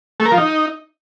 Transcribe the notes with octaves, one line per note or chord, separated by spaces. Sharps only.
A3
A#4
F3
D#4